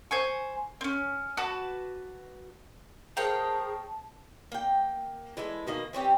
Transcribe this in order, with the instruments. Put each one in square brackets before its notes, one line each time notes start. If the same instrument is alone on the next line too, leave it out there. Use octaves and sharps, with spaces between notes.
[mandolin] C5 G#5 C#6
C4 C#4
F#4 B4 A5 D6
[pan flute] G#4 [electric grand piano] A#4 C5 A#5 [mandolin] C#5 F5 G5 [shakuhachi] A5
[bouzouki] A#3 G5
E3 G#3 E4 A4
B2 D#3 A#3 D#5
E3 C4 C#4 G4